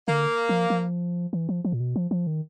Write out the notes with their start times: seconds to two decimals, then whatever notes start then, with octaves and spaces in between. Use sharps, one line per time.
0.07 D3 A#3
0.49 F3
0.70 F3
1.33 E3
1.49 F3
1.65 F3
1.72 A#2
1.80 B2
1.96 F3
2.11 F3
2.27 D#3